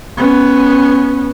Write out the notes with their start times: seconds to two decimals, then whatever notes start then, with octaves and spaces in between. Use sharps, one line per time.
0.17 B3 C#4